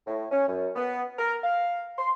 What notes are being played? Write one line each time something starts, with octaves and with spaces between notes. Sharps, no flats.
A2
C#4
F#2
B3
A#4
F5
C6